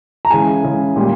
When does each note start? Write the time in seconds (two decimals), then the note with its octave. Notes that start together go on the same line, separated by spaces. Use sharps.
0.25 A#5
0.31 C#3 E3 G#3 G#5
0.63 C#3 E3 G#3
0.96 A#2 G3